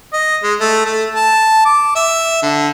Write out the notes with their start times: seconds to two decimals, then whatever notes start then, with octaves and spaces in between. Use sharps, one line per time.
0.13 D#5
0.43 G#3
0.60 A3
0.85 A3
1.14 A5
1.65 D6
1.96 E5
2.43 D3